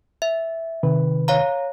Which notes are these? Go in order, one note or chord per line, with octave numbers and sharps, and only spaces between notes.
E5
C3 D#3 B4
C#5 F5 A#5